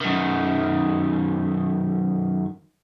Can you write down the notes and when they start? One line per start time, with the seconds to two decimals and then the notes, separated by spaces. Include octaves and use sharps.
0.01 F#2 D#3